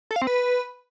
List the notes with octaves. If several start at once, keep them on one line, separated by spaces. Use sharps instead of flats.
A4
F5
C4
B4